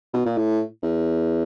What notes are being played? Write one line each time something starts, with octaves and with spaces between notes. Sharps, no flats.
B2
A#2
A2
E2